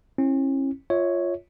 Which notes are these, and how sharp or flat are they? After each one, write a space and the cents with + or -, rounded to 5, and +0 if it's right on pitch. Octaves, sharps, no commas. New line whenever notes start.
C#4 -40 E4 +0
F4 +0 C#5 +0 E5 -35